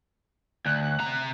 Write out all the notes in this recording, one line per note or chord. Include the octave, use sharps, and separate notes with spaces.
D2 F#6
C3 A#5